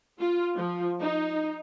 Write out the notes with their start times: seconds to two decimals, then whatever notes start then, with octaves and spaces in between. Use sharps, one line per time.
0.19 F4
0.56 F3
0.99 D#4